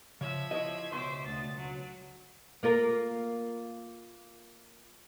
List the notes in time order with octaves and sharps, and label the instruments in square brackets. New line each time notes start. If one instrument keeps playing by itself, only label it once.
[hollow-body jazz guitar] C#3 [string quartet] F3 E5 G#6
[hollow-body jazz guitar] E4 C#5 D#5
[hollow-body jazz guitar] C#2 B2 C6 [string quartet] C5 E5 D6
[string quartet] D2 A6
F#3
[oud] A#3 F4 A#4